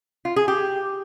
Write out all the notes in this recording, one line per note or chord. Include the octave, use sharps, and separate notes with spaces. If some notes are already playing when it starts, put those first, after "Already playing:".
F4
G#4
G4